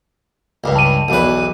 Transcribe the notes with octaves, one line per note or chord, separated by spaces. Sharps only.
C#2 G2
A5 D#7
B1 E2 B4